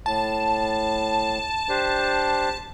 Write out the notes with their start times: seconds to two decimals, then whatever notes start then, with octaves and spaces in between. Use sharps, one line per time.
0.06 A2 A5
1.69 D4 G4 C5